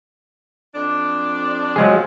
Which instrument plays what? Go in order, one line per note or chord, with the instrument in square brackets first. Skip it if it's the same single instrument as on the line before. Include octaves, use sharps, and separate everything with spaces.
[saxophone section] F2 D4
[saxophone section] F3 [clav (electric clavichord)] F#3 G#3 G#4